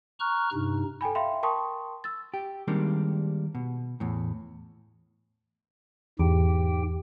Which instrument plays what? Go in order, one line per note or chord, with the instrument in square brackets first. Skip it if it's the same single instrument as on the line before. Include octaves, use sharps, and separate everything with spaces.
[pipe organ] A#5 C#6 F6 F#6
G2 C3 D#4
[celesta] A4 G5 G#5 B5
E5 F5 G5 B5 C6
A#4 G5 A5 C6 C#6 D#6
E6 A6
[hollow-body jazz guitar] G4
D#3 G3 G#3 A#3 C4 D4
B2
E2 A2
[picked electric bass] E2 [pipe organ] G#2 G4 G5